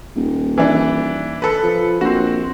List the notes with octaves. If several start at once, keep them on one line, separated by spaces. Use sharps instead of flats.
D#1
E3 D4
A4 B4
F3
A#1 C4 F#4